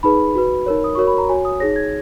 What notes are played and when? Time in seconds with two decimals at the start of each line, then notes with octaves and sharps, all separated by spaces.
0.03 D#4 G#4 B4 B5
0.35 F#4 B4
0.66 D#4 A#4 C#5
0.84 D#6
0.95 F#4 A#4 C#5 C#6
1.07 B5
1.18 A#5
1.29 F#4 C#5 G#5
1.45 D#6
1.60 D#4 G#4 C#5 A#6
1.76 G#6